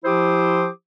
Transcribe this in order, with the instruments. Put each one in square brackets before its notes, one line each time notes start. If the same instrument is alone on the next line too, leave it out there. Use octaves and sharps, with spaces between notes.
[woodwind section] F3 E4 G4 C5 D6 D#6